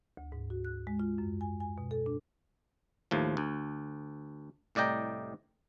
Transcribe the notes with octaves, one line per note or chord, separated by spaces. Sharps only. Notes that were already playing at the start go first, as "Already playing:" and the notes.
D2
G#2
F#4
F#6
G#3
F4
F#2
G#5
G#5
B2
A4
D4
D#2 A2 F3
D2
C2 A2 D5 D#5 G5 A#5